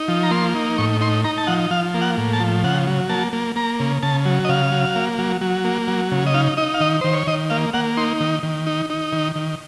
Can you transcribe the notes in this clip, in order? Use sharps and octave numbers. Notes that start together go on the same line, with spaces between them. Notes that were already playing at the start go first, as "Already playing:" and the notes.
Already playing: D#4
F3
A#5
A#3 C6
D#4
A2 C#6
D#4 C6
D#4 A#5
A5
F3 F#5
F3 F5
A#3
F#5
A2
A5
F3
C#3 F#5
F#3
A#3 A5
A#3
A#3 A#5
C#3
C#3 A5
F#3
D#5
C#3 F5
F#3
A#3
F#3
F#3
A#3
F#3
C#3
D#5
D#4 F5
D#4 D#5
F5
D#3 D#5
D#3 C5
C#5
D#3 D#5
A#3 F5
A#3 F#5
D#4 C6
D#3
D#3
D#4
D#4
D#3
D#3